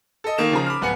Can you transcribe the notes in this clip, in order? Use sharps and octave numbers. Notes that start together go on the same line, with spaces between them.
A4 D#5
D#3 A#3 E7
C#3 F3 G#4 A#5
B5 D6 F6
D1 B3 F#5 G#5 B5 C#7